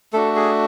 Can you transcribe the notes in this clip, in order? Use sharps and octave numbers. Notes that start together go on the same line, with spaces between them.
A3 D4 F#4 A4
G#4